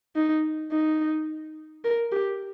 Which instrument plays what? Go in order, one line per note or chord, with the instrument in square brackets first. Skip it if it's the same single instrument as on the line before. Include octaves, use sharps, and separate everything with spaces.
[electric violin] D#4
D#4
A#4
G4